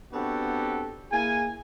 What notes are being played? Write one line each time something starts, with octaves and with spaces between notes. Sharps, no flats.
B3 C4 D4 F#4 G4 A4
A#3 E4 G#4 G#5